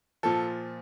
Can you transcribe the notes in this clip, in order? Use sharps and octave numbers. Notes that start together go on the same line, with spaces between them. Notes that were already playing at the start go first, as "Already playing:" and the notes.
A#2 F3 A4